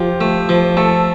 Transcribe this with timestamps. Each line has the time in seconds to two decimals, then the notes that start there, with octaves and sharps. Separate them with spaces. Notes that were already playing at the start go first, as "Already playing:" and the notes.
Already playing: F3 F4 G4
0.21 A3
0.49 F3
0.77 A3 A4